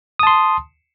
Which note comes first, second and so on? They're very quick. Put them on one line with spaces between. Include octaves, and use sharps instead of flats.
D#6 A5 C6